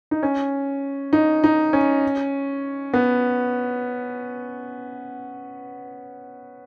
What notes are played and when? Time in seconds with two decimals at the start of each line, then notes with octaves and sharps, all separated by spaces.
0.11 D#4
0.23 C#4
1.13 D#4
1.44 D#4
1.73 C#4
2.94 B3